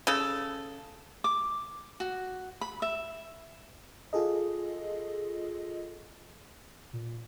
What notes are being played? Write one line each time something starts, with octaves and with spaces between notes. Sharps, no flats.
C#3 A4
D6
F#4
B5
E5
F4 G#4 A4 D#5
A#2